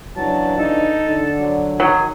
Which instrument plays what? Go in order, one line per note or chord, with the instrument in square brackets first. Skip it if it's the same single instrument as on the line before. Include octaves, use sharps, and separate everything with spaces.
[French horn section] C#3 E3 D4 [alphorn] F#3 [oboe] A5
[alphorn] D#4 [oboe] A4
[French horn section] D3
[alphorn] F#3
[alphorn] D#3 [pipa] F#3 [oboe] G#4